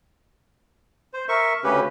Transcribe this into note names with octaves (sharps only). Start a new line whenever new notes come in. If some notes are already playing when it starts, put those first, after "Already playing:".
C5
A#4 E5 C#6
D2 C#3 C#4 G4 B4